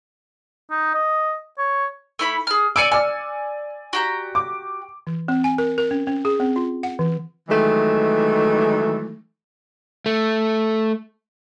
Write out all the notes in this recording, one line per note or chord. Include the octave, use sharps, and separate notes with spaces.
D#4
D#5
C#5
A3 E4 B5
G#4 F6
D5 G#5 D6 E6 C#7
D5 G#5 F6
F#4 G4 A#5
D6
E3
C4
G#5
A#4
A#4
C#4
C#4
G#4
C4
F4
F#5
E3
D#3 E3 F#3 G#3 A3
A3